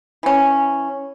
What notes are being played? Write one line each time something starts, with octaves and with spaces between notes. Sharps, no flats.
E3 C#4